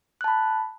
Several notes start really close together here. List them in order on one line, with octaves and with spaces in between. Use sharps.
F#6 A5 B5